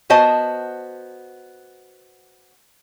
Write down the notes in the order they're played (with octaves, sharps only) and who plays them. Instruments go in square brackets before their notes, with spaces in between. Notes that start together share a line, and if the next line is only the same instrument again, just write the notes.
[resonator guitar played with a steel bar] B3 F#4 C5 D#5 A5